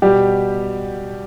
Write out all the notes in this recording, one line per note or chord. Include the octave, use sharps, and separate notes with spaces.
B2 G3 G4